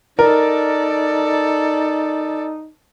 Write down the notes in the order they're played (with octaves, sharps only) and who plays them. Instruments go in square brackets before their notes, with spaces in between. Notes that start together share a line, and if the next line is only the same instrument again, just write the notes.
[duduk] D#4 [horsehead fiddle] A4 D5 [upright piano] A#4